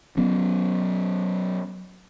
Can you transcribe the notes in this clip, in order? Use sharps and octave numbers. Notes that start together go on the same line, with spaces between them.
F#3 B3 C#4